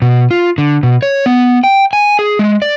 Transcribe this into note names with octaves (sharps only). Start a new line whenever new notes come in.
B2
F4
D3
B2
C#5
B3
G5
G#5
G#4
G#3
D5